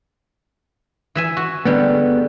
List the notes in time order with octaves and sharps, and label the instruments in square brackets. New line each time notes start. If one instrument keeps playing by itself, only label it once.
[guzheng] E3 E5 G#5
F#4
[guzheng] D3 G3 G#3 [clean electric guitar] B3